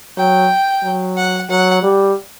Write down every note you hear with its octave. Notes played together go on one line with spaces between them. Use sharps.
F#3 G5
F#3
F#5
F#3 F#5
G3